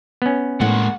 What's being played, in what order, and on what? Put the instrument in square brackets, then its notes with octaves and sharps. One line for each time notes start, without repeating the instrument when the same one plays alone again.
[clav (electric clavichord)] B3 C#4
[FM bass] A2 [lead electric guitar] G#3 A#3 [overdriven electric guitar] F#5